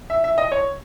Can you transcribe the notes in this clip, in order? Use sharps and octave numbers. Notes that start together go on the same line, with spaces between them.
E5
E5
D#5
C#5